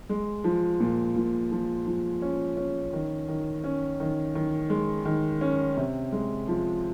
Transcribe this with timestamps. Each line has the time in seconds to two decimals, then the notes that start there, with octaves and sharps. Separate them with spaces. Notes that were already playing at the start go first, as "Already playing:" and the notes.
0.09 G#3
0.44 F3
0.80 A#2
1.16 A#2
1.52 F3
1.86 F3
2.22 C#4
2.57 C#4
2.93 D#3
3.28 D#3
3.64 C#4
4.00 D#3
4.35 D#3
4.70 G#3
5.05 D#3
5.41 C#4
5.77 C3
6.12 G#3
6.48 F3